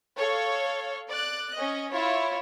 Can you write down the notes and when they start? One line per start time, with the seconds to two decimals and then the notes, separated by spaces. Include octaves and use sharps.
0.17 A4 C#5 F5
1.09 D5 F#6
1.54 C#4 D#5
1.91 E4 F4 C#5